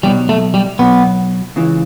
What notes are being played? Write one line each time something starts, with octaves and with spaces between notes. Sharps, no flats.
B1 B2 F#3 G3
A3
G3
B1 B2 F#3 B3
C#2 C#3 E3